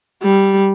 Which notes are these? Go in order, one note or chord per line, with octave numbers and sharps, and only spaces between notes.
G3